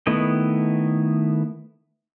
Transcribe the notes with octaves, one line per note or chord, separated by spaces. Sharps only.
D#3 A3 B3 E4 D#5